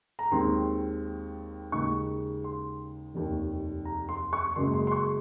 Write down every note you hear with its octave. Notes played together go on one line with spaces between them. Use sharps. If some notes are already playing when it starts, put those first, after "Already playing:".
A#5
D#2 D#3 G#3 C4 C6
D#2 C#3 G#3 D#4 C#6
C6
F1 D#2 D#3
A#5
C6
C#6
F#1 F#2 C#3 G#3 C6
C6
C6
C#6